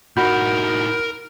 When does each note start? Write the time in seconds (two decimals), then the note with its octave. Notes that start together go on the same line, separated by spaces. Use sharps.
0.17 A2 D#4 F#4 A#4 B5 G6